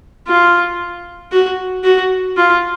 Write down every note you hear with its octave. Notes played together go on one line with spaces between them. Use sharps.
F4
F#4
F#4
F4